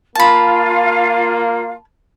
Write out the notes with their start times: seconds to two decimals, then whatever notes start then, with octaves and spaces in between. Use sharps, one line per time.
0.15 A#3 F4 F5 A5 B5